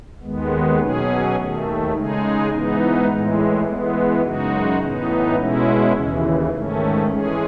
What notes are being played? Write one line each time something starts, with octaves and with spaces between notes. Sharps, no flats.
D#2 D#3 G#3 B3
B2 F#3 C#4 G#4
D#2 D#3 A3
C#3 G#3 D#4 G#4
G#2 E3 B3 D#4
A2 E3 G#3
E3 G#3 B3
F#2 C#3 G#3 D#4 F#4
A2 E3 B3 D#4
B2 G#3 C#4 E4
D#2 C#3 E3
G#2 D#3 A3 C#4
E3 G#3 C#4 G#4